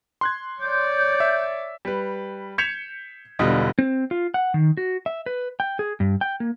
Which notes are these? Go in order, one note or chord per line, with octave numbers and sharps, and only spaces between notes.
C6 F#6 G#6
C#5 D5 G6
E5
G3 B4
G6 G#6 B6 C#7 E7 F7
E1 B2 D3 G3 F4 D#5
C4
F4
F#5
D#3
F#4
E5
B4
G5
G#4
G2
G5
A#3